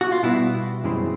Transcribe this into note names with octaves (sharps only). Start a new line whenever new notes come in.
F#4
F4
B2 G3 B3 E4
F#2 C#3 E3 G#3 C4